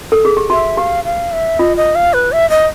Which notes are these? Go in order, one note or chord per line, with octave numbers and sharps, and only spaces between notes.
A4
G#4
G4
F#4 E5
G4 F5
F5
E5
F4 D#5
D#5
F5
B4
E5
D#5